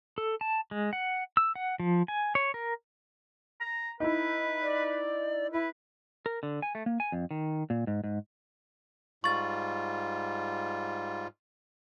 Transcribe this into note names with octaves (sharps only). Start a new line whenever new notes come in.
A4
A5
G#3
F#5
E6
F#5
F3
G#5
C#5
A#4
A#5
D#4 E4 B4
D5
E4 B4
A#4
D3
G#5
A3
A#3
G#5
F2
D#3
A#2
G#2
G#2
G#2 G3 F4 C#6 A6